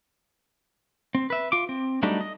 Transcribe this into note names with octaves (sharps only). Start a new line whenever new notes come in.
C4
B4 E5
F4 D6
C4
F#3 G3 A3 D4 D#4
D#5